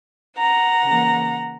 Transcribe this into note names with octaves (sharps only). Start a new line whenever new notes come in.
F#5 A#5
C#3 E3 A#3